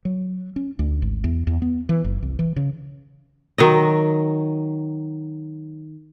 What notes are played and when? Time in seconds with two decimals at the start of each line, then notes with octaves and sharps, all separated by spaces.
0.05 F#3
0.56 C#4
0.79 D2
1.02 G#1
1.24 E2
1.47 E2
1.62 B3
1.89 E3
2.04 F#1
2.22 C2
2.39 E3
2.56 C#3
3.58 D#3 F#3 D#5